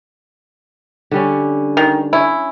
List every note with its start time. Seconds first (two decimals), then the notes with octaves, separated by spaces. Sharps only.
1.11 D3 G3 C#4
1.77 D#3
2.13 C#4 E4